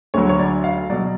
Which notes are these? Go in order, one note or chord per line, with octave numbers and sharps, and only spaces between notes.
D2 D3 F#3 C#5
C#5
D5
F5
B2 F#3 D5